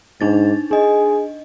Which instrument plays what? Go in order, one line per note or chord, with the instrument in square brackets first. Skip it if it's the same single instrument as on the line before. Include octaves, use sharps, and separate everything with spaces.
[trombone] G#2 [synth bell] D4 D#4 A6
[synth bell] D4 D#5 [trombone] G#4